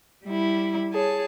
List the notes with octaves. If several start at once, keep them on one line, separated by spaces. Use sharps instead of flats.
G3 E4
G#4 C#5 A5